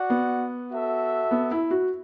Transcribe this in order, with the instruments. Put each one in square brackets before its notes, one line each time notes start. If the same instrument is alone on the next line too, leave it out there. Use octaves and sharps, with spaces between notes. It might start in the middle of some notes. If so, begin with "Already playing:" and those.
Already playing: [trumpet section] F#4 D5 F#5
[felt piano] B3
[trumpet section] F#4 A4 E5
[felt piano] B3
E4
F#4